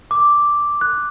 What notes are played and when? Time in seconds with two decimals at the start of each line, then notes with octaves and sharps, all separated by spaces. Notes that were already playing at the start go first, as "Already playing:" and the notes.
0.11 D6
0.81 F#6